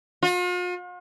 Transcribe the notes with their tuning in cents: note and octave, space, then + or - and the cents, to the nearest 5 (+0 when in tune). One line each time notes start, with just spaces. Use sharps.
F4 +45